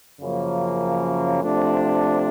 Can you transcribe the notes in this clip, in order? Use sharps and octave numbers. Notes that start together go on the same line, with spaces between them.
F#2 C#3 F3 A#3
C3 F3 A3 D4